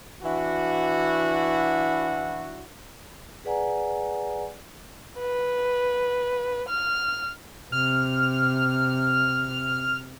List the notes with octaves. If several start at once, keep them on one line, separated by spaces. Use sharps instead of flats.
E3 D4 E4 F#4
G#4 B4 D5 F#5 G#5 A#5
B4
F6
C3 F6